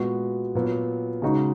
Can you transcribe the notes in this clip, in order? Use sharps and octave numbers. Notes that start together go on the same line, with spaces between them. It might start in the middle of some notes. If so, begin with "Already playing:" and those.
Already playing: A#2 G#3 B3 F#4
A#2 F#3 B3
C#3 G#3 D#4 F#4